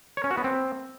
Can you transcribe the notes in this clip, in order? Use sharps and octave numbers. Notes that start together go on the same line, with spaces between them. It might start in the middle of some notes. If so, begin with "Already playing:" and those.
C#5
C#4
F#4
B3
C4